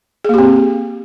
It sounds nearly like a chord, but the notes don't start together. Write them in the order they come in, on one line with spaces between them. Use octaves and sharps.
G#4 A#3 G4 C4